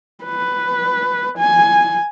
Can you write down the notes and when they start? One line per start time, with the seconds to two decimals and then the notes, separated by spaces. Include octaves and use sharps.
0.24 B4
1.38 G#5